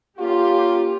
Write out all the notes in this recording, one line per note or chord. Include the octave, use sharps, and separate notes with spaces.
A#3 C#4 F4 G4